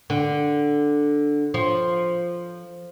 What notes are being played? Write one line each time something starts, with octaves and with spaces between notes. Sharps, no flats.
D3
F3